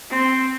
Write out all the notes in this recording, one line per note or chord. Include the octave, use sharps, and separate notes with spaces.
C4